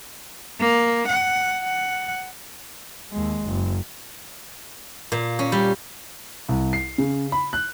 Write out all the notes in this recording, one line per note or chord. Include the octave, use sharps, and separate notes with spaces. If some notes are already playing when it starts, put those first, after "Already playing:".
A#3
F#5
F#5
D#2 G#3
F#1
A#2
C#4
G3
C2
C7
C#3
B5
F#6